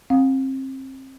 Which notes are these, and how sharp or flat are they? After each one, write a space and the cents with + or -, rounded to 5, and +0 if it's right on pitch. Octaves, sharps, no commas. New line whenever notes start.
C4 +30 F5 +35